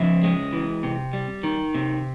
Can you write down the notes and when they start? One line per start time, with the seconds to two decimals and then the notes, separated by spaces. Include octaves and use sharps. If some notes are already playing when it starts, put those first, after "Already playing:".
Already playing: C#3 F3 E5
0.23 G#3
0.53 E3
0.83 C3
1.13 G3
1.43 D#3
1.75 C3